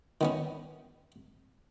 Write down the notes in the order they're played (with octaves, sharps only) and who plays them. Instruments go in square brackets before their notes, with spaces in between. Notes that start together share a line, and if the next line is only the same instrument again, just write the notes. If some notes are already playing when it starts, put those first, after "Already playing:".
[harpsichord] D#3 B3 C#4